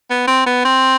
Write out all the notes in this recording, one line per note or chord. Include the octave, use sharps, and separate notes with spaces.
B3
C4
B3
C4